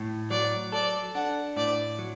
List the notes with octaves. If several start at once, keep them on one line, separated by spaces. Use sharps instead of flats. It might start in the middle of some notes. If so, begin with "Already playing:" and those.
Already playing: A2
F#3 D5
A4 D5
D4 F#5
A2 D5
F#3